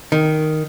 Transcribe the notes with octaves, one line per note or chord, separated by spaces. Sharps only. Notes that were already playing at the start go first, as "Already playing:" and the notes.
D#3